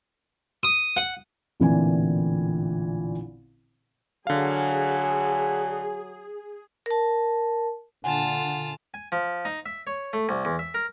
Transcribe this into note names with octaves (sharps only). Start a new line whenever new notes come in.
D#6
F#5
A1 A#2 D3 E3 C4 G#5
D3 F#3 G#4 F5 G#5
A#4 A5
A#2 D3 F4 F#5 G#5 A5
G#5
F3
D#4
E5
C#5
A3
C2
E2
E5
A#4